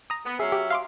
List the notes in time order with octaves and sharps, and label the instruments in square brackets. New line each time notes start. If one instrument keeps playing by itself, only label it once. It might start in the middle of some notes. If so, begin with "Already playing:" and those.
[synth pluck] A#5 D#6
[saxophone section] B3
[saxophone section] F#3 C#4 E5 [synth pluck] G#4 C7
[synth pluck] G4
F5 C6 D6